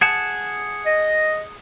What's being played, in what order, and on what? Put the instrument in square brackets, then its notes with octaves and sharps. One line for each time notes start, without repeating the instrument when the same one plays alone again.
[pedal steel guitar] G#4 F#5 A5
[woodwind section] D#5